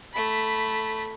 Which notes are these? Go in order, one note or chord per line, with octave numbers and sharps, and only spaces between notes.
A3 B5